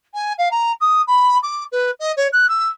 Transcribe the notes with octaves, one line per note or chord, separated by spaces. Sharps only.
G#5
F5
A#5
D#6
B5
D6
B4
D#5
C#5
F#6
E6